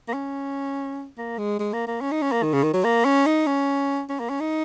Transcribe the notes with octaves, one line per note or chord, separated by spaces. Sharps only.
A#3
C#4
A#3
G#3
G#3
A#3
A#3
C#4
D#4
C#4
A#3
D#3
C#3
D#3
F#3
A#3
C#4
D#4
C#4
C#4
A#3
C#4
D#4